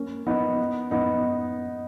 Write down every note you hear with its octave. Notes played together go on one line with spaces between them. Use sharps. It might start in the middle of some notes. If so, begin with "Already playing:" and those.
Already playing: A#3 C#4
B3 D#4
B3 D#4